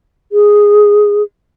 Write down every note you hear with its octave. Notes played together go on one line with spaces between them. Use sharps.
G#4